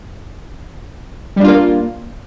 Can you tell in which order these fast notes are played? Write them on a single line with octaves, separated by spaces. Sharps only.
G3 D4 F4 A#3